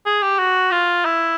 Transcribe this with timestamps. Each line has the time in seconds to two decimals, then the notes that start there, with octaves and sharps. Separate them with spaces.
0.06 G#4
0.22 G4
0.39 F#4
0.72 F4
1.05 E4